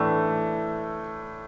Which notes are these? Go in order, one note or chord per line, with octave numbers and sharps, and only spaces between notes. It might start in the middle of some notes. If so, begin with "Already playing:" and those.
Already playing: A2 E3 A3 D4